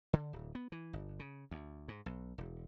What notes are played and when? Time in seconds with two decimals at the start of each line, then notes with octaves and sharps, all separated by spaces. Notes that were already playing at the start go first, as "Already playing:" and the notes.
0.13 D3
0.33 D1
0.55 B3
0.72 E3
0.93 G1
1.19 C#3
1.51 D2
1.88 G#2
2.06 B1
2.38 E1